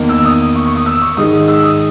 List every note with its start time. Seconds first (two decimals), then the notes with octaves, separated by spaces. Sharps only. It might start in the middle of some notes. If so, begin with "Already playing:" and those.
Already playing: E2 D#3 A#3
0.09 E6
0.25 D#6
0.55 C#6
0.66 C#6
0.76 D#6
0.86 E6
1.02 C#6
1.17 G#2 D#3 G#3 D#4 D#6
1.48 E6
1.64 D#6